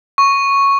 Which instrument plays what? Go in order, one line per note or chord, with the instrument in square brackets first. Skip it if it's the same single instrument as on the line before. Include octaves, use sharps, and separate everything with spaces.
[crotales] C#6